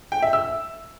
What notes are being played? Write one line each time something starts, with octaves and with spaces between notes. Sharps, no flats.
G5
E5
E6